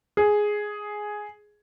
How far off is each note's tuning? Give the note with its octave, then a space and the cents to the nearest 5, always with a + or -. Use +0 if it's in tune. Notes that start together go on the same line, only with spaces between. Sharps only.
G#4 +5